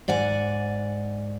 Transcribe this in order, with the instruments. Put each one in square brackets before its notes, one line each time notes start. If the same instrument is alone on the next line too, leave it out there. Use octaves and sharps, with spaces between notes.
[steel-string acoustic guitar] G#2 D5 F#5 G#5